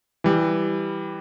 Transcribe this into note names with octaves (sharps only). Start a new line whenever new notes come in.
E3 G3